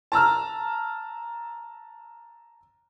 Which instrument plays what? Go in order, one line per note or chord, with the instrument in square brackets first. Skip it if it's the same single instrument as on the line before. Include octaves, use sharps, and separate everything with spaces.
[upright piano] A5 A#5 E6 F6